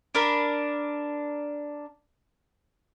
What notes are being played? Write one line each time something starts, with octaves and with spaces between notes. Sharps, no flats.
D4 A#4 B5